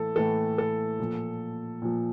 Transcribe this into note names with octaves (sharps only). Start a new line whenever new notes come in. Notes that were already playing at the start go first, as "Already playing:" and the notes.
Already playing: A2 E3 A4
A2 E3 A4
A4
A#2 F3
A#2 F3